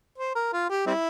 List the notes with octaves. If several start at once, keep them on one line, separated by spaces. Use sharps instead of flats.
C5
A#4
F4
G4
G3 C4 E4